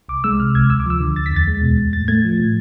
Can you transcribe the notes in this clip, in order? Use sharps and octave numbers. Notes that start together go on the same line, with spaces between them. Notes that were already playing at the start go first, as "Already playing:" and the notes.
C2 D6
G#3 E6
C3 F6
C2 G#6
D2 E6
D6
F3 E6
D3
D2 A6
B6
E2
A6
G#3
B2
E2
A2 A6
A3 G#6
F3
A2